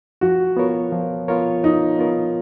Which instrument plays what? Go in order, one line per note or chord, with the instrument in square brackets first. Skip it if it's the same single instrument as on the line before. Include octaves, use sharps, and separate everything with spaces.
[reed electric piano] F3 [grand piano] F#4
[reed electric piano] B3 F4 A#4 C#5
F3
B3 F4 A#4 C#5
[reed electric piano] F3 [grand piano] D#4
[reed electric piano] B3 F4 A#4 C#5